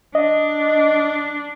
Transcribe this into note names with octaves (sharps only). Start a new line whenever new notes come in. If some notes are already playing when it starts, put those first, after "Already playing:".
D4 D#5